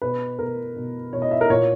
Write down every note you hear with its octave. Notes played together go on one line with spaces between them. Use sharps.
B2 B4
B2 A#4
B2
B2 C#5
D#5
E5
A#4
A#2 C#5